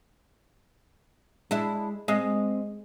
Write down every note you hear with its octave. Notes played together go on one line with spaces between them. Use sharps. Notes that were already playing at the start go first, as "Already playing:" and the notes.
G#3 D4 E4
G#3 C4 D#5